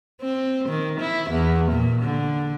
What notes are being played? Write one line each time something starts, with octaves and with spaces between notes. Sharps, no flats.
C4
D#3
E4
E2
A#2
D3